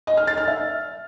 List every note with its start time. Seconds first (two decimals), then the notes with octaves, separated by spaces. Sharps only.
0.07 D#5
0.17 F6
0.27 A6
0.37 F6
0.48 E5